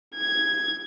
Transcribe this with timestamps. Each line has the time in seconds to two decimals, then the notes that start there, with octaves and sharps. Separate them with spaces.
0.16 G#6